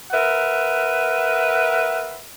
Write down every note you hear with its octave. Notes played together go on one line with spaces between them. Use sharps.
A#4 B4 E5 F#5